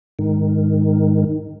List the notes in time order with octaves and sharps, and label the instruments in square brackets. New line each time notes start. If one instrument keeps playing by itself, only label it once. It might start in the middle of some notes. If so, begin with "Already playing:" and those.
[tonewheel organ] G#2 D#3